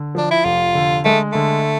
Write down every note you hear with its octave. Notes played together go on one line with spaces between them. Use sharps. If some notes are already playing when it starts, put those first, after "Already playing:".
Already playing: D3
F3 D4
E4
F1 F4
D3
G#3 A3
D3 A3